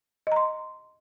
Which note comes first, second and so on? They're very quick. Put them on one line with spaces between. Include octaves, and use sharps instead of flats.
D#5 A#5 C6